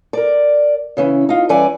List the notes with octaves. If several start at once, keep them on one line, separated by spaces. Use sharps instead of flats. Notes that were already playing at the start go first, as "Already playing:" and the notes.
A#4 D5
C#3 E3 C#4
D#4 F4
G2 E3 C#4 D5 G#5